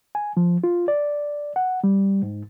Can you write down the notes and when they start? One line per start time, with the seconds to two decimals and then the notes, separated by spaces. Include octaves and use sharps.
0.15 G#5
0.37 F3
0.64 F4
0.88 D5
1.56 F#5
1.84 G3
2.23 G#2